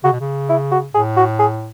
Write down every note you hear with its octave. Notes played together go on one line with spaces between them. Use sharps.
C#3 F#4
B2
C#3
E4
F#4
A2 G#4
F#4
G#4